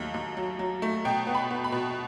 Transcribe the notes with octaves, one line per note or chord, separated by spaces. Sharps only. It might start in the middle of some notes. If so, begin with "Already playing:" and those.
Already playing: D#2 F#3 A3
D#2
F#3
F#3
A3
B2 G5
B3
B5
B3
B5
B2